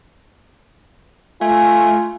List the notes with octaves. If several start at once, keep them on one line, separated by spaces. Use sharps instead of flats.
A3 F4 G#5